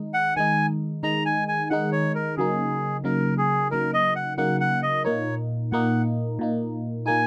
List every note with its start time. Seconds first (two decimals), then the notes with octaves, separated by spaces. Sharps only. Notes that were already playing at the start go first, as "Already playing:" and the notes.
Already playing: D#3 G#3 D#4
0.14 F#5
0.36 D#3 G#3 D#4 G#5
1.03 D#3 G#3 D#4 A#5
1.25 G#5
1.48 G#5
1.70 D#3 G#3 D#4 F#5
1.92 C#5
2.15 A#4
2.37 C#3 F#3 A#3 D#4 G#4
3.04 C#3 F#3 A#3 D#4 A#4
3.38 G#4
3.71 C#3 F#3 A#3 D#4 A#4
3.94 D#5
4.16 F#5
4.38 C#3 F#3 A#3 D#4 F#5
4.60 F#5
4.83 D#5
5.05 A#2 A#3 D#4 C#5
5.72 A#2 A#3 D#4 F#5
6.39 A#2 A#3 D#4
7.06 A#2 A#3 D#4 G#5